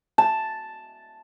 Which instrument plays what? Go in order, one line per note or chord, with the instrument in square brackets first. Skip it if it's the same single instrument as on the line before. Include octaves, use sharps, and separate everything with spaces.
[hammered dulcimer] A5